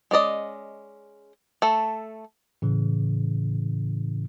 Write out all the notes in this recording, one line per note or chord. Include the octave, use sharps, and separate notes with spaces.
G#3 C#4 D5 D#5
A3 A4
A2 C#3 E3